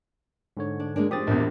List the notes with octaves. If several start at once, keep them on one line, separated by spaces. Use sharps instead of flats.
G#2 D3 C#5
D4
G#3 A#3 D4
F3 C4 G4 D#6 A6
A#1 E2